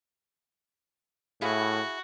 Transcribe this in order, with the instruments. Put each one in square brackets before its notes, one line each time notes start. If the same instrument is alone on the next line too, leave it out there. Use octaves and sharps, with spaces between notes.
[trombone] A2 [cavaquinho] E4 G#4 F5 [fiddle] F#4